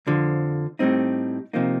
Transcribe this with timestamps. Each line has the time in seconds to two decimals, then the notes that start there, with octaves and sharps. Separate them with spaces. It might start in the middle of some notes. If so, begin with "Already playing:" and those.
0.07 F2 D3 F3
0.79 A2 G3 C4 D#4
1.53 C3 F3 A#3 D#4